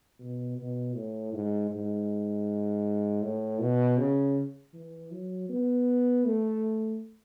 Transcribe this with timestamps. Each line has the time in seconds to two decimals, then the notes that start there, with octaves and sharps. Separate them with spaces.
0.19 B2
0.57 B2
0.95 A2
1.33 G#2
1.71 G#2
3.22 A2
3.60 B2
3.98 C#3
4.73 E3
5.11 F#3
5.49 B3
6.25 A3